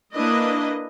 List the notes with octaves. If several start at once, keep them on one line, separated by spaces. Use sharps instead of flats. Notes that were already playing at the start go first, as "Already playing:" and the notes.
A#3 D4 E4 B4 D#5